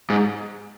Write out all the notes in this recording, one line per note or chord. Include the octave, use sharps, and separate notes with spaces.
G#2